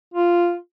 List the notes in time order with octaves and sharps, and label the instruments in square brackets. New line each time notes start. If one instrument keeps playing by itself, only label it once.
[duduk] F4